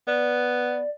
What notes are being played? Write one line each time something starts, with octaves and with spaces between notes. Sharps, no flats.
B3 D5